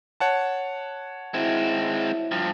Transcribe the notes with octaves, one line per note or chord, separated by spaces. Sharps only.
C#5 F#5 A5
G#3 C4 E4 F#4 E5
G2 F3 C5